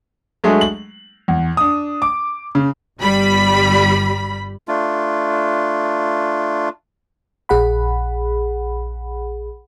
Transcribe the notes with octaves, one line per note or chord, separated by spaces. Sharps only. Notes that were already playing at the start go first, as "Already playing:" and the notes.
F#3 G#3 A3 D4 G#4
F#7
E2
D4 D#6
D6
C#3
G1 G3 B5
A3 D4 F4
A#1 G#4 F#5 B5